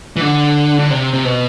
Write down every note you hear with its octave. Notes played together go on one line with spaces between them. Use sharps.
E3
D3
D3
C3
C3
B2